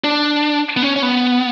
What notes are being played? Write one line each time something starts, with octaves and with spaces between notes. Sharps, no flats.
D4
B3
C#4
C#4
B3